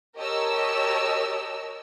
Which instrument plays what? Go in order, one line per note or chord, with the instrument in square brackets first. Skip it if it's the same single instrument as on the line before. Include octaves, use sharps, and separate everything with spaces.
[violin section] G4 A#4 C#5 D#5 A5 E6